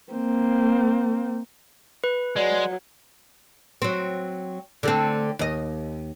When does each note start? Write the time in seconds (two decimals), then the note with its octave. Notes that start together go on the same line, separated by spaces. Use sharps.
0.12 A#3 C4
2.04 B4
2.37 F#3 G#3 D5
3.82 F#3 C4
4.83 D3 A3 C4
5.39 D#2 D#5